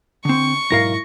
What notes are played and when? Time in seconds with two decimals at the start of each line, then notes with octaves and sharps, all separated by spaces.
0.25 D3 C4 C#6
0.71 B1 G#2 E4 A#4 F5 A#6